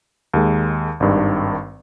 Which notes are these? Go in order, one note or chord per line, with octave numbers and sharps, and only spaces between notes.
D#2 D#3 G#3
G#1 G2 D#3